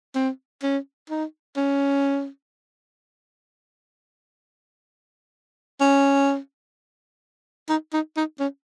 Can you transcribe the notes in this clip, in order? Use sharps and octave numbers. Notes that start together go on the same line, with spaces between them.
C4
C#4
D#4
C#4
C#4
D#4
D#4
D#4
C#4